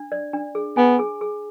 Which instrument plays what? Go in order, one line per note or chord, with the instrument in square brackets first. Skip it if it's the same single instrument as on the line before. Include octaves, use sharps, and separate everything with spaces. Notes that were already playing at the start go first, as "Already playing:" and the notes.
Already playing: [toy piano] D4
D5
D4
G#4
[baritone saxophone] B3 [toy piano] G#5
[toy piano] G#4
G#4